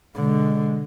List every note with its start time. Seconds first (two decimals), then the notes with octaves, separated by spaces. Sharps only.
0.15 B2 D3 G#3